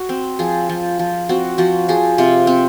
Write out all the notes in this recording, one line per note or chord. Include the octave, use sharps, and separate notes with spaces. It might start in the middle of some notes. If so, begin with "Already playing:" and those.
Already playing: F#4
C4
F3 G#4
F3
F3
C4 F#4
F3 F#4
F3 G#4
C3 F4
C4